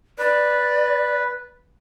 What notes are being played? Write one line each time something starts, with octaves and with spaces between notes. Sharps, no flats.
B4 D5